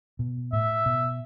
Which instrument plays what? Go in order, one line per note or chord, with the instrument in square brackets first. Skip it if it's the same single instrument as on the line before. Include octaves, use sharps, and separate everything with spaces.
[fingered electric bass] B2
[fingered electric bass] A2 [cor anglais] E5
[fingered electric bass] B2